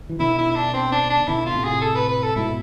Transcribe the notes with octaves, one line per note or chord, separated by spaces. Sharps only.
E3
B2 D3 E4
E4
E4
D4
C4
D4
D4
B2 D3 E4
F4
A2 C3
G#4
A4
B4
B4
A4
G#2 B2 E4